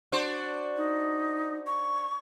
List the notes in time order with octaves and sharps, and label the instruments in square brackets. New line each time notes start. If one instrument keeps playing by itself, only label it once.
[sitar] D4 F#4 C5
[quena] D#4
C#6